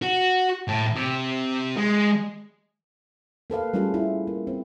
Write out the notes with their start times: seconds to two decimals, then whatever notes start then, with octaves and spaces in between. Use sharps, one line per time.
0.02 F#4
0.68 A2
0.96 C3
1.77 G#3
3.50 A#3 A4 B4 F5
3.74 G3 A3 C#4 F4 G#4 A4
3.94 E4
4.27 A#3
4.47 C4